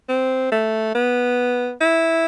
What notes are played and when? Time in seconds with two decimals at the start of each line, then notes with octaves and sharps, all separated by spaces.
0.09 C4
0.52 A3
0.95 B3
1.81 E4